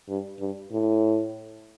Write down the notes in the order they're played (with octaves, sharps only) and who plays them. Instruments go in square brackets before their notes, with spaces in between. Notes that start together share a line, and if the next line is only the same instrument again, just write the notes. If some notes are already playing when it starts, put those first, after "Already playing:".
[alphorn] G2
G2
A2